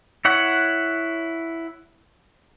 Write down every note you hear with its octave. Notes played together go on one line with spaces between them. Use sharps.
E4 C#5 F#5